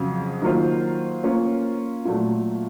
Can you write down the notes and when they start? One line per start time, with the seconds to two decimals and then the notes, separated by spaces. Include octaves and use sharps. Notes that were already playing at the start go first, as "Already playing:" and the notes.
Already playing: F2 C#3 F#3
0.42 D#3 F#3 A#3 F4 C5
1.24 A#3 C#4 F4
2.05 A#2 F#3 A3